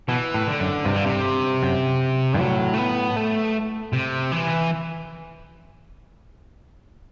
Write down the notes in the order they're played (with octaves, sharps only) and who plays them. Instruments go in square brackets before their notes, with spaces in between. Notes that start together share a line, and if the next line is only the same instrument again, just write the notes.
[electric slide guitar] B2 [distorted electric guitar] E3
[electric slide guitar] A2
[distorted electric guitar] D3
[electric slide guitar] F#2
[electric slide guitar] G2 [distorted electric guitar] C3
[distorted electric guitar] D3
C3
[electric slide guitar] F#2
G2
[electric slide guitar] A2 [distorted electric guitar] F#3
[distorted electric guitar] A3
B3
A3
C3
E3